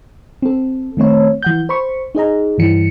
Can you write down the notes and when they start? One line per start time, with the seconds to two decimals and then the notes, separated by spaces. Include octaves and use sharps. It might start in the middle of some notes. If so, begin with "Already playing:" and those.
0.42 C4 A4
0.97 D#3 A3 C4 C#5
1.42 E3 F#5 G6
1.69 C5 B5 C#6
2.15 D#4 G#4 D#5 A#5
2.58 G2 E3 C#7